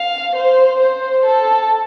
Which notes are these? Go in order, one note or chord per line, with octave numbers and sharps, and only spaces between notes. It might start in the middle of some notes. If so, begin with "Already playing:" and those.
Already playing: F5
C5
C5
A4